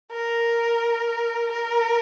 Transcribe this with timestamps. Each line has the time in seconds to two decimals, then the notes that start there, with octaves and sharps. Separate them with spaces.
0.12 A#4
1.52 A#4